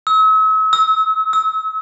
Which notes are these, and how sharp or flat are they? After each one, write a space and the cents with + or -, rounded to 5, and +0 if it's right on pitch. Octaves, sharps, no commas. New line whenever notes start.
E6 -45
E6 -30
E6 -30